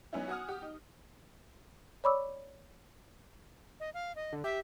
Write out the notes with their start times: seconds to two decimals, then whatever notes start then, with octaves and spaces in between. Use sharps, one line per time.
0.13 F#3 B3 C#4 D#4 E4
0.28 F#4 F#5 G#5 D#6 F6
0.48 G4
0.62 D#4
2.04 C#5 D5 B5 C#6 D6 E6
3.80 D#5
3.94 F5
4.16 D#5
4.33 D3
4.44 G4 E5